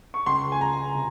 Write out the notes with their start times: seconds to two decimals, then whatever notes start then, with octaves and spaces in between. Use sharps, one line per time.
0.14 C#6
0.26 C#2 C6
0.52 G#5
0.61 C#2 A#5
0.95 C3